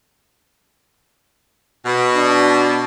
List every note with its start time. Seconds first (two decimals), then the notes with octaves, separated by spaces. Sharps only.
1.85 B2
2.15 D4